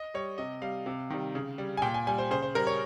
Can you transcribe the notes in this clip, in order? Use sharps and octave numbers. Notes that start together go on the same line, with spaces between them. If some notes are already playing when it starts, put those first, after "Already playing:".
Already playing: D#5
G3 C#5
C3 D#5
G3 F5
C3
D#3 G3
C#3
G3
G#5
A#2 G5
G#5
G3 G#5
C5
C#3 C5
C5
G3 A#4
C#5